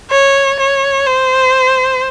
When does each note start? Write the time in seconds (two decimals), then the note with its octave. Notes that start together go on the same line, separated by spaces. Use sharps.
0.11 C#5
0.60 C#5
1.07 C5